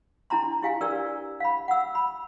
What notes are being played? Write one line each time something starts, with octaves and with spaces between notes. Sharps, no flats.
D4 E4 A5 A#5 C6
E4 G4 F5 G#5
D4 G4 A#4 B4 D5 E6
F5 B5
F#5 E6
B5